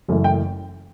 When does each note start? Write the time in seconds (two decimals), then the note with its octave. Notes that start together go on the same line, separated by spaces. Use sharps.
0.08 F#1 F#2 E3 A3
0.24 G5